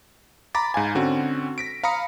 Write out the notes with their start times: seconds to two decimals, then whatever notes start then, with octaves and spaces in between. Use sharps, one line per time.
0.55 A#5 B5 D6 A6
0.74 G#2 F5 G#5
0.95 D3 C4 C#4 F#4
1.58 A#6 B6 D7
1.83 F5 A#5 B5 D#6 C#7